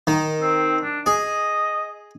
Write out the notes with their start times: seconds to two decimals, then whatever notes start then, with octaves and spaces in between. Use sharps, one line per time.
0.07 D#3
0.41 C4
0.83 D4
1.06 G#4 D#5